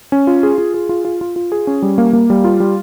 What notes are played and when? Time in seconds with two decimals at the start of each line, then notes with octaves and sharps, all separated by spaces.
0.12 C#4
0.27 F4
0.43 G#4
0.58 F4
0.74 G#4
0.89 F4
1.05 F4
1.21 F4
1.36 F4
1.52 G#4
1.67 C#4
1.82 G3
1.98 A#3
2.13 A#3
2.30 G3
2.44 F4
2.60 G3